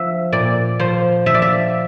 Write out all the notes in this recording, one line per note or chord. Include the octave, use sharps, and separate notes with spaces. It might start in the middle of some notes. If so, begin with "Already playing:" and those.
Already playing: F3 E5
A#2 D5
F3 C5
F3 E5
D5
E5